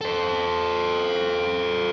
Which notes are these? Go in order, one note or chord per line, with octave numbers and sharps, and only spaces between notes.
A4 C5